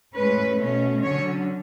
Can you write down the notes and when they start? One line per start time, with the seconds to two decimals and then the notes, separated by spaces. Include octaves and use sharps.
0.15 A2 G#3 C#4 B4
0.59 B2 A3 C#4
1.03 D3 F#3 C#4 C#5